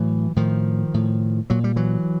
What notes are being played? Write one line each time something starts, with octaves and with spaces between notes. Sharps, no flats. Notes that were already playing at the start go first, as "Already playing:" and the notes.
Already playing: A2 E3 F#3
A2 D#3 F3
A2
A#2 F#3
G3
E3 F#3